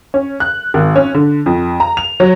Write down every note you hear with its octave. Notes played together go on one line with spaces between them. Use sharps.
C#4
F#6
G#1
C#4
D3
F2
A#5
F7
F#3